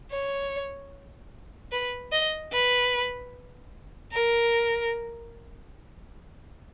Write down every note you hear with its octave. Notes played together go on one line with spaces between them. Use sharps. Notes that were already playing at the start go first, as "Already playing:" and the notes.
C#5
B4
D#5
B4
A#4